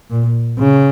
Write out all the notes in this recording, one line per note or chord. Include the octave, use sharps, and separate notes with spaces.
A#2
C#3